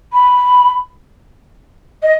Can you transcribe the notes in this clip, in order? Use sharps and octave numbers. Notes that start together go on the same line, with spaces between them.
B5
D#5